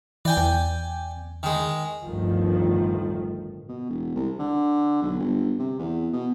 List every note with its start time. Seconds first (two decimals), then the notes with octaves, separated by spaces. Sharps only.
0.25 E3 D5 G5 G#5
0.37 E2
1.43 D#3 G#3
2.04 G1 D2 A2 D#3 F3
3.69 B2
3.90 E1
4.15 C2
4.39 D3
5.02 B1
5.20 G1
5.59 C3
5.79 E2
6.13 B2